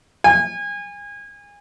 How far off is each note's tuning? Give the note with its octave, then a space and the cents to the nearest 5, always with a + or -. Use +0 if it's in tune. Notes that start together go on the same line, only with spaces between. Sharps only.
G#5 -30